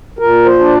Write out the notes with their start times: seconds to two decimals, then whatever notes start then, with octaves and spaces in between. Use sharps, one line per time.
0.19 A#2 A#4
0.45 C5
0.59 D4